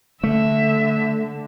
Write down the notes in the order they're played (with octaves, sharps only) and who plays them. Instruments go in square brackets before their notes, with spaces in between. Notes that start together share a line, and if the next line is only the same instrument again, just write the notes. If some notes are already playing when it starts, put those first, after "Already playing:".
[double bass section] D3 [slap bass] A3 [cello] E5